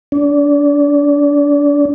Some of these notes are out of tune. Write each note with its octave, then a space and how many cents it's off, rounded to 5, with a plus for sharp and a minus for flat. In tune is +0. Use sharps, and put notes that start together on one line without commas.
D4 -30